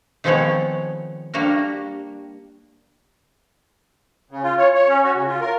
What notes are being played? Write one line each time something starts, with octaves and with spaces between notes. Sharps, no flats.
D#3 F3 G#3 B3 C4 C#5
G3 A#3 D4 F#4 A#4
C#3
F4
C#5
C#5
C#4
F#4
C#3
F4
A#4